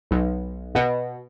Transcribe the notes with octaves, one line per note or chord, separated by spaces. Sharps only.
B1
B2